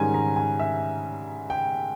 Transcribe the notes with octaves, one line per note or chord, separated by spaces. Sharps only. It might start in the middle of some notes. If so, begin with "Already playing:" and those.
Already playing: G#2 D#3 G3 C#4 G#5 A#5
A#5
G#5
E5
G5